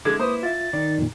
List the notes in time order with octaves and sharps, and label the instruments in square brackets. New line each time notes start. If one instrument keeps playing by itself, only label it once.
[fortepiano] D3 G#3 [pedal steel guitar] E4 D6 [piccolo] G#6
[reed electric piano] A#3 B4 [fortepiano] C5 [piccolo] D#6
[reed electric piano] F4 E5 [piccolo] A6
[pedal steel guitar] D#3 [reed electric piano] D5
[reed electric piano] F2 A#2